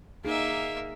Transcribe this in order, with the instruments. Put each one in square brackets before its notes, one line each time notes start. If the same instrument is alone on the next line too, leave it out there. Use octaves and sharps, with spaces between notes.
[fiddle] A#3 E5 [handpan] D#4 G#4